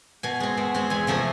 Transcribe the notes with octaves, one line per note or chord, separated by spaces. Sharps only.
B2 G#5
G#3 C4
B2
G#3 C4
E2 G#5
C3 F3 A3 C4